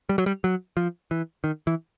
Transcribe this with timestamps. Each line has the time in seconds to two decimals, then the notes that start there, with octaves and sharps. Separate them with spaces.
0.09 G3
0.18 F#3
0.26 G3
0.44 F#3
0.77 F3
1.11 E3
1.44 D#3
1.67 E3